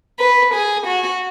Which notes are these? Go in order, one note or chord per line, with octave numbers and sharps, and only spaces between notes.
B4
G#4
F#4